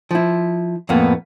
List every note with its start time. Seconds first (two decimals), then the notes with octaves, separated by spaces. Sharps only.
0.11 F3 E4
0.89 F2 A2 A#3 B3